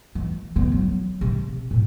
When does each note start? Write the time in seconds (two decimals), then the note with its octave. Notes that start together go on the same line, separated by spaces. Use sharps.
0.15 E3
0.56 D3 B3
0.72 F#3
1.21 C3
1.71 A2